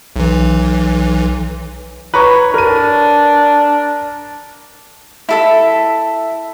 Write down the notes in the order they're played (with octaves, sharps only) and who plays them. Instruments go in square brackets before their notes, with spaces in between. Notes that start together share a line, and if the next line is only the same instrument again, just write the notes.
[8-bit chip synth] B1 E3
[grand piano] B4 A#5 C#6 [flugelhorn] C#5
[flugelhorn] D4 [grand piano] A#4 D#7
[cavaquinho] E4 A4 E5